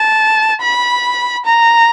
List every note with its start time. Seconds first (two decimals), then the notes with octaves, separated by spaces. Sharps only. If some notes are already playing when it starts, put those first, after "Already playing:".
Already playing: A5
0.61 B5
1.46 A#5